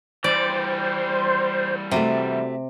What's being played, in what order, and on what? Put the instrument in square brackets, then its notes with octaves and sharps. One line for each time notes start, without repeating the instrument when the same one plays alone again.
[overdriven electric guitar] E3 G3 [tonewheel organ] C5 [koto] D5
[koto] C3 [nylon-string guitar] A3 F#4 G4